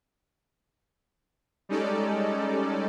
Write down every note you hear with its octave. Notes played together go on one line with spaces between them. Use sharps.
G3 G#3 C#4 D#4 A4 D5